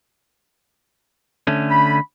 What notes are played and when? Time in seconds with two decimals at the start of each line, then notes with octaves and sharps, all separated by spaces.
1.47 D3 A3 C#4
1.71 B5